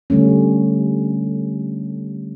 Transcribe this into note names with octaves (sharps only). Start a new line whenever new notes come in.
D3 G3 A3 C#4